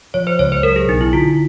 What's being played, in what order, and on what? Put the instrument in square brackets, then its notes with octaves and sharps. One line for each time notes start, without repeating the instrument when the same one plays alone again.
[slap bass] F3 [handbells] C#5
[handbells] C5
[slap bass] C#2 [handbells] C#5
[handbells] C5
[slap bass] F#3 [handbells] A#4
[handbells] G#4
[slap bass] B1 [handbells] D#4
[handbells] E4
[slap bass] D3 [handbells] F4